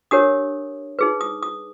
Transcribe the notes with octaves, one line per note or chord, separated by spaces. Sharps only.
D4 G4 A#4 C#5 D#6
D#4 G#4 B4
D#6
D#6